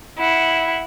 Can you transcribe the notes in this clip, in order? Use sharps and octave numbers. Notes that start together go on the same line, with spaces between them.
E4 F#5